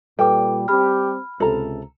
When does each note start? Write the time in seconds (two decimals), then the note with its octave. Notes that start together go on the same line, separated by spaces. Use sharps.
0.19 A#2 G3 A4 B4 G5 D6
0.68 G3 C4 G4 B5 F6
1.40 C#2 C3 A4 A#5